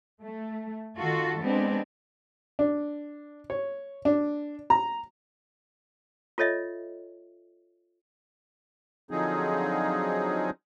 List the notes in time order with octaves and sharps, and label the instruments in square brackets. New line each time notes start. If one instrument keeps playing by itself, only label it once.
[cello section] A3
D#3 F4 F#4 A4
G#3 B3 C4 D4
[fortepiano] D4
C#5
D4
A#5
[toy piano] F4 A4 C#5 D#5 E5
[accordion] D3 F3 F#3 C4 D#4 G#4